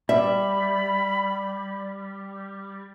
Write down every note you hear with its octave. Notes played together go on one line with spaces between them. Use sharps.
G3 D5 E5 B5